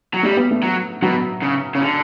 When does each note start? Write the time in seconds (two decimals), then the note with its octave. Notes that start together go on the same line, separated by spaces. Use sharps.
0.14 F#3
0.23 G3 A3
0.37 B3
0.51 A3
0.63 F#3
1.02 B2 F#3
1.42 C#3
1.75 C#3
1.82 D3